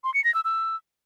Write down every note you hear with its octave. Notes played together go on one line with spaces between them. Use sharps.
C6
C#7
A#6
E6
E6